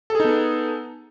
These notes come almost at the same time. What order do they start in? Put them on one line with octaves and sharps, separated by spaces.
A4 G#4 D#4 B3